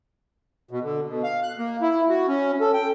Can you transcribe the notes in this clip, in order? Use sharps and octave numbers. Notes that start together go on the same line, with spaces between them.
B2
D3
B2
F5
F#6
A#3
E4
F#4
C#4
A4
G5